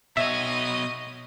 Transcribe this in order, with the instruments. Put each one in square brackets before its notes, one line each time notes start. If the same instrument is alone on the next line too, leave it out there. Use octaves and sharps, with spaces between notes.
[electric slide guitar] B2 C#5 [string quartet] D#5 [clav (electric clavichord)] E5